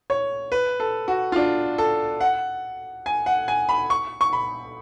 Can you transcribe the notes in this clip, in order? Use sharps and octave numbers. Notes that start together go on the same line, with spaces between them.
C#5
B4
A4
F#4
F4
D4
A4
F#5
G#5
F#5
G#5
B5
C#6
C#6
B5